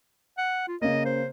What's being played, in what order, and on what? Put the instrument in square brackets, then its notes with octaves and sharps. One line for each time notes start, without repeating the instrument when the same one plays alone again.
[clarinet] F#5
F4
[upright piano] C#3 A#3 [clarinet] D#5
[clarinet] C5